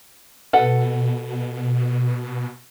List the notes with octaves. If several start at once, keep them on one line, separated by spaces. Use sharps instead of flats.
B2 A4 B4 F#5